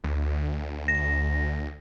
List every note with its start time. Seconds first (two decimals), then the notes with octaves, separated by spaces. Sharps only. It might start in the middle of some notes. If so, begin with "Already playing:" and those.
0.04 D2
0.88 A#6